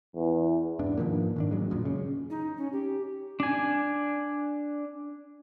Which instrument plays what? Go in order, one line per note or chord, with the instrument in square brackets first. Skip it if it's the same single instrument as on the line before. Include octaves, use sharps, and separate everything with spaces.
[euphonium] E2
[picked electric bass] E1 G#2 D4
G#2 D#3 F3 A#3
G#2 D#3 D4
A1 F#3 G#3
A1 F#2 A#2
C#3
[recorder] D#4
C#4
G4
[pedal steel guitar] D4 G#5